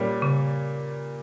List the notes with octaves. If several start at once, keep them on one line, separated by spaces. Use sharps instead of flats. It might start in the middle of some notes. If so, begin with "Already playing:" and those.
Already playing: A#2 G3 C#4
C#3